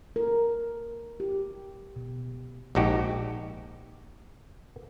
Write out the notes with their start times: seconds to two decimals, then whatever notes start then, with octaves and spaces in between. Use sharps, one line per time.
0.16 A#4
1.20 G4
1.96 B2
2.75 A#1 G#2 D#4 F#4 G4